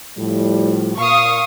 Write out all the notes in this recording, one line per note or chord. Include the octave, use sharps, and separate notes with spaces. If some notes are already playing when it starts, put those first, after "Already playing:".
A2 F3 G3
A#2 F5 C#6 D#6